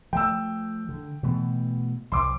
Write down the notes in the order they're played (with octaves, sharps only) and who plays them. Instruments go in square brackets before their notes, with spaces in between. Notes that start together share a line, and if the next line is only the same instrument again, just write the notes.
[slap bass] F3 A3 [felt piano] G5 E6
[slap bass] D3
B2 E3 A3
[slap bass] C2 F3 [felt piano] C6 D6